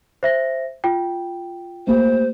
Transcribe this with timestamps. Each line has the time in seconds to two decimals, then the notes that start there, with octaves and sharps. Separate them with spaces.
0.23 C5 E5 A#6
0.84 F4 G5
1.87 A3 A#3 G4 C5